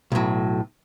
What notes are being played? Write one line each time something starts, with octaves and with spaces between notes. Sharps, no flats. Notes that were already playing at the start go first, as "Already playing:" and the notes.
B1 A2 F#3